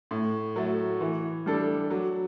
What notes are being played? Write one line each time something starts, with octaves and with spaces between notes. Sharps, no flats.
A2
F#3 A3
E3
G3 D4 A4
F#3